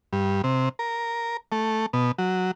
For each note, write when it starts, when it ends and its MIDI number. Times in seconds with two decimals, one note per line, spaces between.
0.13 0.42 43
0.44 0.69 48
0.79 1.37 70
1.52 1.86 57
1.93 2.12 47
2.18 2.51 54